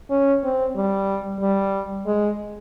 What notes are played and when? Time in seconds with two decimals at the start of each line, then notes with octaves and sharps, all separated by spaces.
0.11 C#4
0.44 C4
0.76 G3
1.41 G3
2.06 G#3